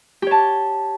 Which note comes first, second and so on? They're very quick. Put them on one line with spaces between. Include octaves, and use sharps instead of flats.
G4 C#5 A5